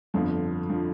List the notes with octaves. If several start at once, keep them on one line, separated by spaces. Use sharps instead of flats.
G1 F2 D3 F3
D3 F3